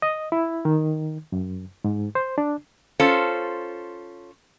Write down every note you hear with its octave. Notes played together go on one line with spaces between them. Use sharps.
D#5
E4
D#3
F#2
G#2
C5
D4
C#4 F4 A4 C5